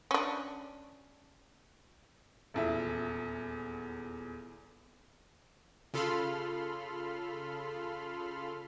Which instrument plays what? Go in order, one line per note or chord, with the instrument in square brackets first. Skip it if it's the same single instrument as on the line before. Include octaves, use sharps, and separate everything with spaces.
[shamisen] C#4 D4
[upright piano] D#1 E2 E5
[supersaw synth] C#3 F4 A4 B5 C6 F6